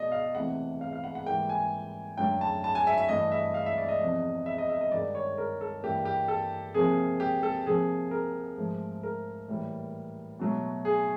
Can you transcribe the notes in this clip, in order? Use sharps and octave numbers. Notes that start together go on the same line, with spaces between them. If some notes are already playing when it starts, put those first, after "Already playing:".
Already playing: B2 D5 D#5
F5
E2 C3 E3 A3 F#5
F5
F5
F#5
F#5
G#2 E3 G3 A#3 G5
G#5
F#2 D3 F#3 A3 G5
A5
A5
G#5
E5
E5
G2 E3 A3 D#5
E5
F5
E5
D5
D#5
E2 C3 F3
E5
D#5
E5
D#5
G2 D#3 G#3 D5
C#5
A#4
A4
G2 E3 G3 A#3 G4
G4
A4
C3 F3 A#3 G#4
G4
A4
C3 F3 A#3 G#4
A#4
G#2 F3 A3
A#4
A2 E3 G3 A#3
B2 F#3 A3
G#4